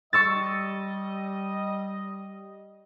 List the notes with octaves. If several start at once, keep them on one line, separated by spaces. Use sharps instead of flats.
G3 D#5 C#6 E6 A6